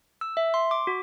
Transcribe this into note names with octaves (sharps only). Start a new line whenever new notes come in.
E6
E5
C6
D6
F#4